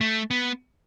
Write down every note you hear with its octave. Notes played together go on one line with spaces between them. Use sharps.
A3
B3